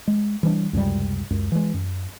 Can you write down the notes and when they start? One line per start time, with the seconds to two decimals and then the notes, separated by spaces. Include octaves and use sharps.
0.08 G#3
0.43 E3 G3 D4
0.73 C#2 F#2 C3 G3
1.30 C#2 F#2
1.52 E3 G#3
1.74 F#2